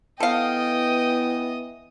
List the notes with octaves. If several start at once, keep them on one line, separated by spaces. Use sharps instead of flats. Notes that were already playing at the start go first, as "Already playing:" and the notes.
E3 B3 A4 D#5 F5 G5